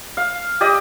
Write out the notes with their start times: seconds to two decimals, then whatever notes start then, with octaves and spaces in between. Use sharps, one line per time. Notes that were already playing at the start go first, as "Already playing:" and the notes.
0.17 F5
0.61 G4 D5 D#5